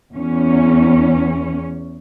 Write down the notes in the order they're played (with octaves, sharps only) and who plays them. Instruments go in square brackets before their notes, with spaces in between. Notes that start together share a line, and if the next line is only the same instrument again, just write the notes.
[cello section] E2 C#4